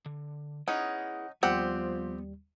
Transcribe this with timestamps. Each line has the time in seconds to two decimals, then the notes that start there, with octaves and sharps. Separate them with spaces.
0.06 D3
0.68 C#4 D#4 E4 G#4 B4 F#5
1.43 D#2 F3 G3 B3 C4 G4 F#5